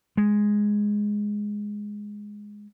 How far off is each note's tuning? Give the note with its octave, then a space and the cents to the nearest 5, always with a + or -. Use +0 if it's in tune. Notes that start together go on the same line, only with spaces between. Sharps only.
G#3 +0